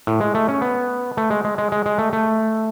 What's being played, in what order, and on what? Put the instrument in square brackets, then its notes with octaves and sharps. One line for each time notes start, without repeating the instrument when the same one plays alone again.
[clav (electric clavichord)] A2
G#3
A3
C#4
B3
A3
G#3
G#3
G#3
G#3
G#3
A3
A3